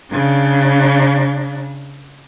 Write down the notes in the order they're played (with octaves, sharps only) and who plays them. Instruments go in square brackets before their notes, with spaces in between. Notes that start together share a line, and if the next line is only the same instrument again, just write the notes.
[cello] C#3 D4